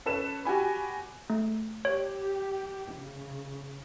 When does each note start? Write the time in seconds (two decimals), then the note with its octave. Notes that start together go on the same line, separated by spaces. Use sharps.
0.06 C#4 A4 B4 E7
0.45 F#4 G4 G#5 B5
1.30 A3
1.85 G4 C#5
2.92 C#3